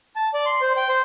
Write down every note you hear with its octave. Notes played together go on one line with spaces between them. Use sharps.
A5
D5
C6
C5
G5
C5